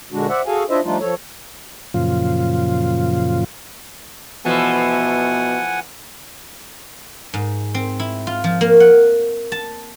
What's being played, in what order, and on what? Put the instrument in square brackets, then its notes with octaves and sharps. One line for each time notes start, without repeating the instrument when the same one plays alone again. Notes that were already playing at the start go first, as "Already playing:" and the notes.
[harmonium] A#2 D3 G#3 D4 F#4
C5 D5 E5 F#5
F#4 G#4 A4 F5 G#5
D4 E4 F4 C5 D#5 E5
F3 G3 A3 D4 D#4 F4
F3 A4 C#5
[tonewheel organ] F#2 A#2 C#3 F3 F4
[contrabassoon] B2 [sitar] E3 F3 A3 [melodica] F#5 G#5
[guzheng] G#2
C4
E4
F4
F3
A#3
F#5
A5